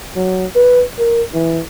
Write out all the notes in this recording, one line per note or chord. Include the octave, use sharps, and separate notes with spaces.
F#3
B4
A#4
E3